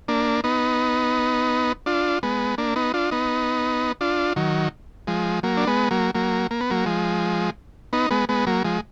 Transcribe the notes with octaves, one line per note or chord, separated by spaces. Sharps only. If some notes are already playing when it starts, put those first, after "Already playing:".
A#3 D4
B3 D#4
D4 F4
G#3 B3
A#3 D4
B3 D#4
D4 F4
B3 D#4
D4 F4
D#3 F#3
F3 G#3
F#3 A#3
D4
G#3 B3
F#3 A#3
F#3 A#3
A#3
B3
F#3 A#3
F3 G#3
B3 D#4
G#3 B3
G#3 B3
F#3 A#3
F3 G#3